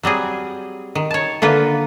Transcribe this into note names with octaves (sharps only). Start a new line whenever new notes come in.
F#3 G3 C4 G#4
D#3
C#5 A5
D3 A#3 F4 B4